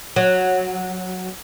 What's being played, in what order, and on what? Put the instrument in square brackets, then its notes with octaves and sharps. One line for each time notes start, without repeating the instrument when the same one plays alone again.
[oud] F#3